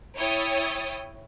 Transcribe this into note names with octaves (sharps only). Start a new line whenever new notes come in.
E4 C#5 G5 D#6 A6